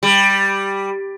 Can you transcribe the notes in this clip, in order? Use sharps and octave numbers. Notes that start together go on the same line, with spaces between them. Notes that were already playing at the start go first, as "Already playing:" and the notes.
G3